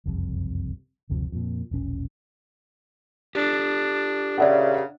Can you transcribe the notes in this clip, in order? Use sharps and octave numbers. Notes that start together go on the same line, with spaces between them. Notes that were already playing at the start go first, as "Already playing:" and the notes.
F#1 C2 F2 C3
F#1 D2 C3 F3
F2 A#2
E1 A#1 C#4
D4 G4 A4
A#2 C#3 D5 E5 F#5